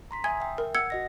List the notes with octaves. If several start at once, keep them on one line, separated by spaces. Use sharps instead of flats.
A#5 C6 B6
E5 G#5 D#6 G#6
E5 G5
A#4
F#5 E6 G#6 C#7
F#4 D#5 A#6